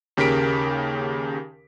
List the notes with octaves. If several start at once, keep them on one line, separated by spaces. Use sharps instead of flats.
D#2 C#3 G4 A#4 B6 D7